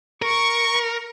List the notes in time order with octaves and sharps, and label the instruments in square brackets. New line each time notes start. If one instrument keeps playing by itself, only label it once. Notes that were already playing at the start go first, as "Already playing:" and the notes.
[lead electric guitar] A#4 [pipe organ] C#6